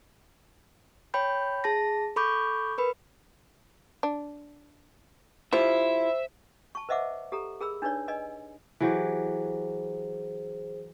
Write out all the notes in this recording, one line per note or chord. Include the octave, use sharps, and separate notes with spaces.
C#5 G5 B5 G6
G#4 A5 A#6
A4 B5 C#6 D6 G6
A#4 B4 B5
D4
F3 E4 F4 G4 C5 E5
A5 C#6
B4 C5 D#5 E5 F#5 D6
G4 A4 A#5
G#4 A#4 B5 E6
D4 D#4 B4 C#5 D5
B4 D5 D#5 G#5
E3 F#3 G4 G#4 C5